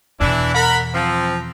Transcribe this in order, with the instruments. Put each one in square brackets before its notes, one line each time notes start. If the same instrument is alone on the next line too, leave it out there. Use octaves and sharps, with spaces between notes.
[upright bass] E2 B2 [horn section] E3 D4 E4
[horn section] A#4 F#5 B5
F3 C4